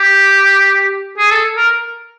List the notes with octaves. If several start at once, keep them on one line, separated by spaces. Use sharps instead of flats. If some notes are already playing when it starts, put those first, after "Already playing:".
Already playing: G4
G#4
A4
A#4